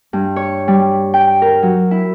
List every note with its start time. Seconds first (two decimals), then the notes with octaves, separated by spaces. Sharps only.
0.13 G2
0.36 C#5
0.68 G3
1.14 G5
1.42 A#4
1.62 F#3
1.91 E4